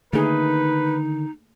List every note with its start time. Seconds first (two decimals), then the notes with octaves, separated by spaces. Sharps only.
0.13 D3 D#3 A3 A#3 D#4 G#4 B4